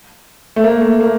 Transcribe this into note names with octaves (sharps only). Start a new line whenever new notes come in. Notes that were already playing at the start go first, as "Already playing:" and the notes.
A3
A#3
A3
A#3